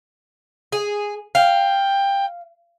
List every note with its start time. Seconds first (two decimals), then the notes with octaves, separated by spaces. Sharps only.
0.72 G#4
1.35 F5 G5